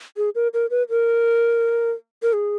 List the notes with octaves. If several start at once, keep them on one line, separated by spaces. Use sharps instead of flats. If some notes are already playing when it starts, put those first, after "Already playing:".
G#4
A#4
A#4
B4
A#4
A#4
G#4